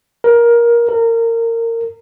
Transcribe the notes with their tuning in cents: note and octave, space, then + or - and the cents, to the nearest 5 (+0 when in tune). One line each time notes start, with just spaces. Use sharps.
A#4 +15
A#4 -25